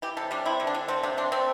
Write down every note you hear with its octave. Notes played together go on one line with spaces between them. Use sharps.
E3 G4
C3 A4
G3 D4
C4 E4
D3
D4
D3
A3 C4
C3 D4
C4 D4
A3 C4